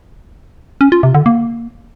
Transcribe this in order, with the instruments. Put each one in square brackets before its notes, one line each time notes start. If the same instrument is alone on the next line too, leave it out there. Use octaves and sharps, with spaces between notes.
[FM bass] C#4
F4
C3
D3
A#3